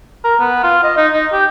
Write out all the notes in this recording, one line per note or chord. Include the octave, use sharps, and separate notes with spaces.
A#4
B3
F4
D#5
D#4
D#4
G4